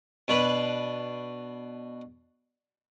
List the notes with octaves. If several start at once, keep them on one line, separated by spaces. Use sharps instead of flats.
B2 D4 B4